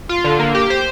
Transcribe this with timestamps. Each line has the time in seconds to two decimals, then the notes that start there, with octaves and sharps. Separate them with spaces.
0.09 F4
0.24 D3
0.39 A#3
0.55 G4
0.70 C5